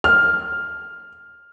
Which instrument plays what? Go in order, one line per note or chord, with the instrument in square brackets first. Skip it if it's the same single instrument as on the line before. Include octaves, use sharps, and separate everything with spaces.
[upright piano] F6